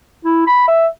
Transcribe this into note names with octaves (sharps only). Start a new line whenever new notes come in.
E4
B5
E5